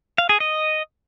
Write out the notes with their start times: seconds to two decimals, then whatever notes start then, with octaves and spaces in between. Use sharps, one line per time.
0.18 F5
0.29 G#4
0.40 D#5